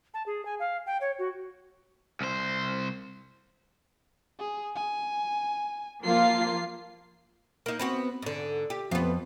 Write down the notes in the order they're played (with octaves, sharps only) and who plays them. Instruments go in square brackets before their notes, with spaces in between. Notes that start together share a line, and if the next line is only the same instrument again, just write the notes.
[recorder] A5
G#4
G#5
F5
G5
C#5
F#4
[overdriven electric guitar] C2 C5
[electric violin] G#4
G#5
[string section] F3 A#3 F4 [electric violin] F5 C7
[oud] A#3 D#4
B3 C4 F#4
G#2 D3
G4
[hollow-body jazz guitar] F2 [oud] B3 F4